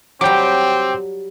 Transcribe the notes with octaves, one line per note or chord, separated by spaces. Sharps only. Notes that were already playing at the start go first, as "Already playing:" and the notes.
F#3 G3 C4 G5 D6